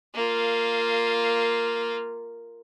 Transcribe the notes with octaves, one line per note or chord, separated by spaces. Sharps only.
A#3 F4